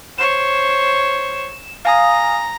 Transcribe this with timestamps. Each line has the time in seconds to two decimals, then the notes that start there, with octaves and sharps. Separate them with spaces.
0.18 C5 C#5 E7
1.85 F5 G#5 A#5 D#6